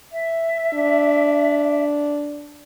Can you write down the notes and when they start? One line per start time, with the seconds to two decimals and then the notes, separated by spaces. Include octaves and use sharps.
0.12 E5
0.74 D4